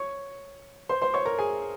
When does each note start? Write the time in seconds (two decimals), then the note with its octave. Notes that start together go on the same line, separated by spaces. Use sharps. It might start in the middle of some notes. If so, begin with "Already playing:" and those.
Already playing: C#5 C#6
0.89 C5 C6
1.02 C5 C6
1.14 C#5 C#6
1.26 A#4 A#5
1.38 G#4 G#5